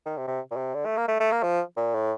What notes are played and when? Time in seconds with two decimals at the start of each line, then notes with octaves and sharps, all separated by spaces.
0.06 D#3
0.18 C3
0.28 C3
0.51 A#2
0.57 C3
0.74 D3
0.86 A3
0.97 A#3
1.08 A3
1.20 A3
1.32 A#3
1.43 F3
1.77 A#2
1.94 A2